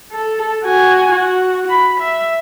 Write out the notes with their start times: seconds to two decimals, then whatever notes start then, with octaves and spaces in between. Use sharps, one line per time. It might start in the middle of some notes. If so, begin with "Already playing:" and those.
0.11 A4
0.64 F#4 G#5
1.11 F#4
1.70 B5
2.01 E5